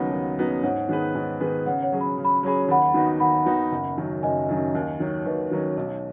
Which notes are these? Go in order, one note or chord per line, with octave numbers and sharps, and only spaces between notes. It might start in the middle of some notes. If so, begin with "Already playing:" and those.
Already playing: D#2 C#3 F#3 B3 D#4 F#5 B5
D#2
C#3 F#3 B3 D#4
G#2 C#5 F#5
D#3 B3 G#4 B4
G#2
D#3 B3 G#4 B4
C#3 C#5 F#5
C#5 F#5
F#3 C#4 G#4
B5
C#3
B5
F#3 C#4 G#4 B5
D#2 F#5 B5
D#3 B3 D#4 F#4
D#2 F#5 B5
D#3 B3 D#4 F#4
F#1
F#2 D#3 F#3
F#1 D#5 G#5
F#2 D#3 F#3
D#2
D#3 F#3 C#4
D#2 B4 D#5
D#3 F#3 C#4
B1 C#5